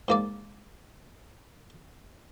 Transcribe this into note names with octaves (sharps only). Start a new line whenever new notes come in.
G#2 A#3 D5